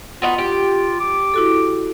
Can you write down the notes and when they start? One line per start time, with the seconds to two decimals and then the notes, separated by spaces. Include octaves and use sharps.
0.22 B3 D#4 F4 F#4
0.38 G4
1.00 D6
1.34 E4 F#4 A4